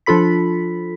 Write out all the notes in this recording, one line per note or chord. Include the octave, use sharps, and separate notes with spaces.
F3 D4 F4 A4 B5 B6